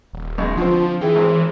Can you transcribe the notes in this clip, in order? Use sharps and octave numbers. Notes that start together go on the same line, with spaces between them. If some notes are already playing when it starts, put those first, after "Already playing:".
D#1
B1 G#3
D3 F3 C4 F4
E3 E4 G#4 G5
G#1 C4